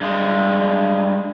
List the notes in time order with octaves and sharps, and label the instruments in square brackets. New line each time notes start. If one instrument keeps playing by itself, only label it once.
[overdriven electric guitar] G2 G#3